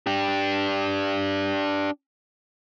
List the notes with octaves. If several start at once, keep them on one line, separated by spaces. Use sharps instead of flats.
D4 G4